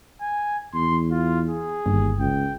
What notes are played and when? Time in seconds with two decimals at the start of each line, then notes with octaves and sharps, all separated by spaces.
0.21 G#5
0.74 E2 C6
1.11 F4
1.48 G#4
1.86 G1 D#2
2.19 C#2 G5